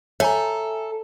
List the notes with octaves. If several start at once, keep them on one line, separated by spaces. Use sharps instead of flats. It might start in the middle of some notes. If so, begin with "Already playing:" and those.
A4 C#5 E5 G#5 A#5